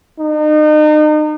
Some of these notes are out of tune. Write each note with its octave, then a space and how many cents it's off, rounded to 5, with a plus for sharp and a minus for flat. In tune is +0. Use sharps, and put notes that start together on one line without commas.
D#4 -35